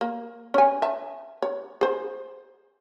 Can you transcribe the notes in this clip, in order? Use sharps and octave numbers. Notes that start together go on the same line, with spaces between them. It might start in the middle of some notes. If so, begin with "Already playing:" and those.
A#3
C#4 G#5
E5 A5
C#5
G#4 C5